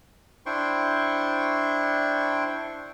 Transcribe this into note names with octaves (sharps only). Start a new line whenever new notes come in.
D4 E4 C5 G5 C6 C#6